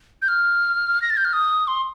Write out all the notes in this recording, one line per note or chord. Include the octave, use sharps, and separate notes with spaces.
G6
F6
A#6
A6
G6
F6
D#6
C6